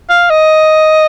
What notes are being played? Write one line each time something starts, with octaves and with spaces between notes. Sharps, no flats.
F5
D#5